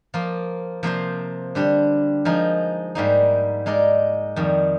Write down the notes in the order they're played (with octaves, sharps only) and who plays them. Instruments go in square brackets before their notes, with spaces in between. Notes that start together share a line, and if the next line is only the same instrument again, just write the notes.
[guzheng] F3 A#3 F4
C3 F3 A#3 F4 C5
D3 G3 D4 G4
F3 G#3 D#4 A#4
G#2 G3 A#3 D#4
G#3 D#4 A#4 D5
F2 D#3 G3